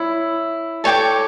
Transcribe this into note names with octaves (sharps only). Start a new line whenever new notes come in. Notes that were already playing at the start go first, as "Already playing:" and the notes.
Already playing: E4 C#5
A4 C#5 G5 D6